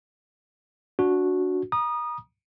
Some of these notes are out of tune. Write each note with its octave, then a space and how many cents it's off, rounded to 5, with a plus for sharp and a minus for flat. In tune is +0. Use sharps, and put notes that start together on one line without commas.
D4 -20 F#4 -10
A#5 +40 D#6 -20